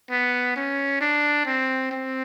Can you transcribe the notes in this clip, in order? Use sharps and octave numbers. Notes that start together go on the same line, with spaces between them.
B3
C#4
D4
C4
C4